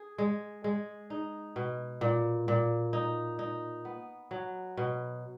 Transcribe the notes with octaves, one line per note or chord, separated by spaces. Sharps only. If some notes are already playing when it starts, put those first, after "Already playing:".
Already playing: G#4
G#3
G#3
D#4
B2
A#2
A#2
D#4
D#4
B3
F#3
B2